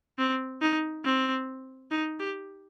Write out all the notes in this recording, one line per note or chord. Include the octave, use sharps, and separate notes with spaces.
C4
D#4
C4
D#4
G4